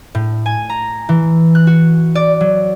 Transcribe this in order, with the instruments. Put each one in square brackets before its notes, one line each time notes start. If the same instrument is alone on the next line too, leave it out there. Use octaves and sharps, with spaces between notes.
[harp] A2
G#5
A#5
E3
F#6
F#4
D5
F#3